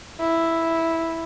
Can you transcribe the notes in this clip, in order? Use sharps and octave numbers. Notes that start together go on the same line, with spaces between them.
E4